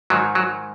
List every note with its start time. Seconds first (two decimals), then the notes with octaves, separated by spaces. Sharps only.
0.10 G#2 D#3 F#3
0.35 F#3